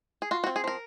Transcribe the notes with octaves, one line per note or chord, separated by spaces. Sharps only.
G#4
F4 F#4
F#4
C4
G#4
F3 A#4